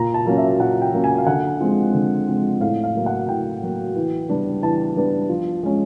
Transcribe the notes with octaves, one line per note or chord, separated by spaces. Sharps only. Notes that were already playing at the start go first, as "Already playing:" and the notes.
Already playing: A#2 A#5
A5
F#3 A#3 C#4
E5
A#2 F#5
G5
F#3 A#3 C#4
G#5
F5
D3 F#5
F3 G#3 C4
D3
F3 G#3 C4
A2 F5
F5
F#3 A#3
F#5
A2 G5
F#3 A#3
E3
G3 B3 D4
E3 A5
G3 B3 D4
F3
G#3 C#4